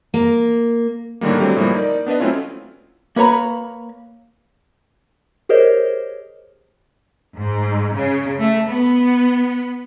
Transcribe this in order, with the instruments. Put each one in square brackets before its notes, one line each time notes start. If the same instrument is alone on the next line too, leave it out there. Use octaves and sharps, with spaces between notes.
[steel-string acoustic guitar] A#3
[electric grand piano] A2 D3 D#3 G3 A#3
D3 F#3 G3 A3 C4 G4
A2 F3 G3 A#3 E4
D#4 A#4 D5
B3 D4 B4 D#5
F#3 A3 C4 C#4 E4 F4
[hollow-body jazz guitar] A#3 B4 C#5 A#5 B5
[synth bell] G4 G#4 A#4 C5 C#5 D#5
[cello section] G#2
C#3
A3
B3